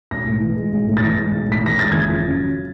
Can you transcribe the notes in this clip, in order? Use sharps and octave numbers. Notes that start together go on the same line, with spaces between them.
B1 A#6
A2
E3
G#3
B1
A2
A6
E3 A#6
G#3
B1
A2
B6
E3 A#6
G#3 A6
F#1 G#6
F2
C#3
F#3